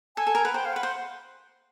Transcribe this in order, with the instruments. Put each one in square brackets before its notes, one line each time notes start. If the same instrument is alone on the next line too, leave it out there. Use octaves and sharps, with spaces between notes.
[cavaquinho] A4 [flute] G#5
[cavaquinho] A4
A#4
[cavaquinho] B4 [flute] F#5
[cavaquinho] C5 [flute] G5
[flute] F5
[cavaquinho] B4 [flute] F#5
[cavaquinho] C5